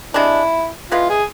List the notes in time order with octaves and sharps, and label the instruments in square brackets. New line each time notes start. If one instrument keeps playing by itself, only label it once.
[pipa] C3 G#3 D4 [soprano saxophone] E4
[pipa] E3 G#3 B3 [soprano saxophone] F4
[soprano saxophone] G#4